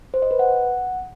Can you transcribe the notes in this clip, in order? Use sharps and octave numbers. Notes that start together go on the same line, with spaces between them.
C5
D#5
B4
F#5